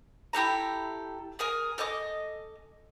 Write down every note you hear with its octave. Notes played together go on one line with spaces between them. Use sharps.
E4 G4 A4 A#5
G#4 A#4 G#5
A4 D#5 G#5 D6